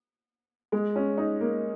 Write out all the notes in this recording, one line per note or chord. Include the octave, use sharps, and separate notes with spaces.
G#3
C#4
D#4
A#3